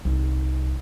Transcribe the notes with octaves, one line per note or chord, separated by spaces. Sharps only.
C2 D#4